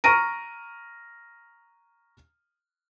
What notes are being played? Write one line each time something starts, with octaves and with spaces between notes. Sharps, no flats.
A#5 C#6 F6 A#6 D7 D#7